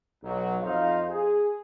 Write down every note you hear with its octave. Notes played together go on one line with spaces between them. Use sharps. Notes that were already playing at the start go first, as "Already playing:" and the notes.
B1 F#3
F2 D#4 C5 F5
G#4